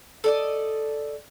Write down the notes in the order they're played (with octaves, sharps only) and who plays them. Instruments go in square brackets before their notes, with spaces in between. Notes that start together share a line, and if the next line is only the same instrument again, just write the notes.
[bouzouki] A4 D5 D#5